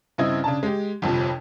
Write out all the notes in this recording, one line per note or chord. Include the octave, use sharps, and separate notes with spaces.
G2 C#3 C4 E4 D#5 G#6
C#3 D4 A5
G#3 G4
G1 F2 C3 F3